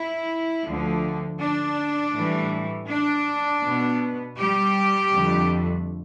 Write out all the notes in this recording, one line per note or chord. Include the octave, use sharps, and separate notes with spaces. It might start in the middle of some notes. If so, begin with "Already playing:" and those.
Already playing: E4
D2 D3 F3
D4
A2 E3 G3
D4
B2 B3
G3 G4
F2 D3 A3